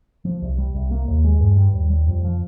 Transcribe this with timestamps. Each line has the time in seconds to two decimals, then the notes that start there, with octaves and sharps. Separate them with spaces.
0.25 F3
0.42 C2
0.58 G3
0.74 C2
0.91 A#3
1.08 D#2
1.24 G#3
1.40 G2
1.57 G3
1.73 D#2
1.90 G3
2.07 F2
2.24 F3